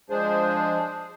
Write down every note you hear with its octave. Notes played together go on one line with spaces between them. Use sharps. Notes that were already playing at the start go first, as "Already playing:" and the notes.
F3 G#3 D4 G#4 C5